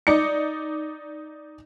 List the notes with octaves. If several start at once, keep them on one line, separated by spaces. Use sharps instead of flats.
D#4 D5 C#7